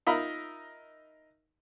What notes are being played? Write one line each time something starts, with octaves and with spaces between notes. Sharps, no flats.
D#4 F4 A#4 D#5 E5 B5